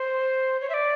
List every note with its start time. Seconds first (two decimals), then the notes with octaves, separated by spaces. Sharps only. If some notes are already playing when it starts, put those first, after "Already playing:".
Already playing: C5
0.61 C#5
0.70 E5
0.74 D5